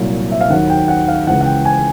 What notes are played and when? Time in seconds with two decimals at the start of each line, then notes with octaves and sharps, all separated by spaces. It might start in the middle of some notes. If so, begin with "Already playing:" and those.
Already playing: C2 A#2 F#3
0.31 E5
0.41 F5
0.50 D#2 D#3 F#3 F#5
0.70 G5
0.88 F#5
1.08 F5
1.27 C#2 C#3 E3 F#5
1.41 F#5
1.46 G5
1.65 G#5